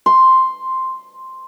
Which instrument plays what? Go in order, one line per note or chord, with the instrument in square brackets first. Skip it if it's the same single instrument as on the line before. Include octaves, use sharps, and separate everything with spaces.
[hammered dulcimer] C6